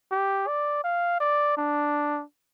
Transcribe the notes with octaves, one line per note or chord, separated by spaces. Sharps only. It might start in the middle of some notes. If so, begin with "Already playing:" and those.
G4
D5
F5
D5
D4